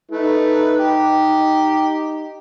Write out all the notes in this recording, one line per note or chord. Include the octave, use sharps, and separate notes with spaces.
A3 D#4 B4
G4